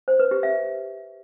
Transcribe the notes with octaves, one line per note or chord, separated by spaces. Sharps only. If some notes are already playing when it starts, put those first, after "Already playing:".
C5
B4
G4
E5